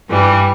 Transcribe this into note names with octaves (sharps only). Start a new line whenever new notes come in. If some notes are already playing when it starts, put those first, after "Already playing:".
G2 E3 G3